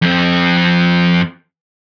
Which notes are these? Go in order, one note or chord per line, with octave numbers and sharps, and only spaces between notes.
F2 C4